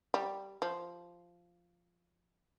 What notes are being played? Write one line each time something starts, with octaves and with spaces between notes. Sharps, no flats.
G3
F3